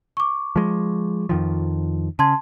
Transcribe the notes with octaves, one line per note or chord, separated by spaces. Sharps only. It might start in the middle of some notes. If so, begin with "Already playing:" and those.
C#6 D6
F3 G#3
F2 D#3 F3
C#3 A5 C6 G#6